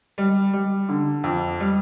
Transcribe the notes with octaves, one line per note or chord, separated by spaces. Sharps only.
G3
G3
D3
F2
G3